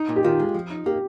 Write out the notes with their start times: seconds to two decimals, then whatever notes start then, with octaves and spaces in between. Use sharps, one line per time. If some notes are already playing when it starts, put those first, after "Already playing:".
Already playing: D#4
0.09 A#2
0.16 G4
0.24 D#3 F4
0.40 G#3
0.54 F3
0.70 D#4
0.86 A#3 G4